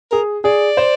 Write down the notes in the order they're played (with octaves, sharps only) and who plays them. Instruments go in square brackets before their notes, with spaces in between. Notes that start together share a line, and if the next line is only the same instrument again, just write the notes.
[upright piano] G#4 [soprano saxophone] A#4
[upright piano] G#4 [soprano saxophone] D5
[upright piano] C5